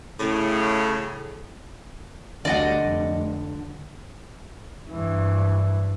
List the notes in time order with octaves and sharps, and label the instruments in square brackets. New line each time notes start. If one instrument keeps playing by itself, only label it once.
[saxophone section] A2 C#3
[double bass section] D2 G3 [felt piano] D3 [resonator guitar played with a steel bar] D5 D#5 F#5
[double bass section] F1
[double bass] G2 E3